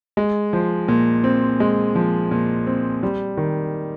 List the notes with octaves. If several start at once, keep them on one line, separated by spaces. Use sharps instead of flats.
G#3
F3
A#2
C4
G#3
F3
A#2
C4
G3
D#3